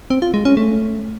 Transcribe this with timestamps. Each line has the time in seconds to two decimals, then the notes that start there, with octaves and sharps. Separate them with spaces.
0.10 C4
0.22 F4
0.34 G#3
0.45 C#4
0.57 A3